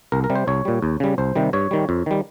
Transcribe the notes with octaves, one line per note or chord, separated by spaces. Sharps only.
C2 A#4
A#4
C3 G3
C5
C2 C#5
A#2 G3
D#2
C#3 G3
C2 C5
C3 D#3 G3
G2 C#5
D#3 G3
F2
D#3 G3